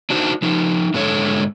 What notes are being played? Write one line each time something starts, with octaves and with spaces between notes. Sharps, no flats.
D4 D#4 F#4 C5
F3 D#4
G#2 D3 G#3 A4 C#5